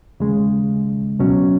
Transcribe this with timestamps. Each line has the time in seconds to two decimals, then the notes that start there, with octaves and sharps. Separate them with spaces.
0.20 D#2 C#3 G#3
1.19 C#2 B2 F#3 C#4